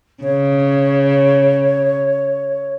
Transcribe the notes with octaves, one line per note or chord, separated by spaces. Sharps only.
C#3 C#5